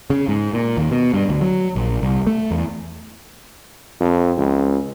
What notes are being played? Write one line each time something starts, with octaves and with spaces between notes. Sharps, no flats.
C#3
G#2
A#2
D#2
B2
G2
D2
F#3
A#1
C2
A3
E2
F2
C#2